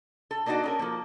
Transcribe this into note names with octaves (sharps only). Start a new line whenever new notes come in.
A4
A#3 D4 D#4 F#4 D5
C#4 A4 A#4
F3 A#3